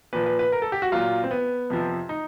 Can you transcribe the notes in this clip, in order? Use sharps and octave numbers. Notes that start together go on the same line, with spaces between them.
A#2 F3 B4
B4
B4
A#4
A4
G4
F#4
A#2 F#3 F4
C4
B3
F2 C3 F3
D#4